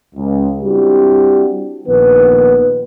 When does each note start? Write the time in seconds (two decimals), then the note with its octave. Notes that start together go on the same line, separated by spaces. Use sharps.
0.16 C#2
0.62 G3 C4 D4 E4 F#4 G4
1.87 A#1 D#3 B3 B4